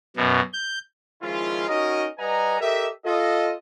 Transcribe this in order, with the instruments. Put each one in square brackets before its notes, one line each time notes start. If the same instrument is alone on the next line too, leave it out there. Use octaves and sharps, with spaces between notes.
[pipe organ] F#2 B2
G6
[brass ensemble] D#3 F3 G#3 C#4 E4 F4
C#4 D#4 F#4 A#4 D#5
G3 B4 D#5 F#5 G#5 A#5
G4 A4 A#4 D#5 E5
F4 A4 D#5